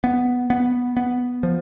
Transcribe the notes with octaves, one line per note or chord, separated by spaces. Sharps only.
B3
B3
B3
F3